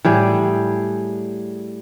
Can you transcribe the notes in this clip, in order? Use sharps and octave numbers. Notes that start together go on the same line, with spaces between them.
A2 G3 G#4